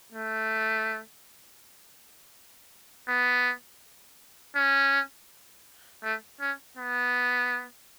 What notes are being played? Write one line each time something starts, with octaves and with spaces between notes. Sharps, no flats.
A3
B3
C#4
A3
C#4
B3